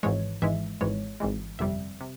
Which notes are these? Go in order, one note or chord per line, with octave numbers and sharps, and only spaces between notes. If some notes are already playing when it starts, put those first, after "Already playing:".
G#1 G#2 E3 G#3 C#5
G#1 G#2 E3 G#3 E5
G#1 G#2 E3 G#3 C#5
G#1 G#2 E3 G#3
G1 F2 C3 G3 E5
C3